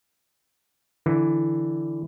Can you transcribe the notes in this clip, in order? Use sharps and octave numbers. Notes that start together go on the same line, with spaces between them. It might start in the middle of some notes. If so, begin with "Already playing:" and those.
D3 E3